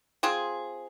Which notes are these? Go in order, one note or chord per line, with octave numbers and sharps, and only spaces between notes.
C4 F4 G#4